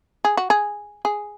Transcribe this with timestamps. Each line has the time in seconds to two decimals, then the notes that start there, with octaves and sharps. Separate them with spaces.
0.25 G#4
0.37 F#4
0.50 G#4
1.05 G#4